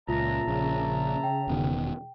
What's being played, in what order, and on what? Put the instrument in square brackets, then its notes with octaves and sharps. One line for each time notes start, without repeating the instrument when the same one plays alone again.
[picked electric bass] C#2 [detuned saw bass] A#2 [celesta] F4 A#6 [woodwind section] E5 A5 A#5
[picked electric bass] A#1 [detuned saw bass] C#3
[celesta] G5
[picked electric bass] E1 B2 D#3